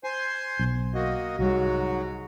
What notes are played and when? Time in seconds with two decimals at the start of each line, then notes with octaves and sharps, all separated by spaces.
0.04 C5 G#5 C6
0.59 B1
0.94 A#3 F#4 D#5
1.39 C2 G#2 F#3 G3 F#4